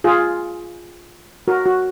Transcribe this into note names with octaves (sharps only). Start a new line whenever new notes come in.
F4 G#4
F#4 A#4
F#4